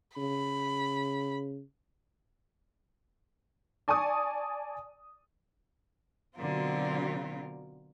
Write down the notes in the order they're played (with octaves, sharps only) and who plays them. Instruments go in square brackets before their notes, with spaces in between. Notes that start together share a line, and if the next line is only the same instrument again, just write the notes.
[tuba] C#3 [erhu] B5
[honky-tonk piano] D5 G#5 A5 C#6 D#6
[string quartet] B2 D3 F#3 C4 F4 A#4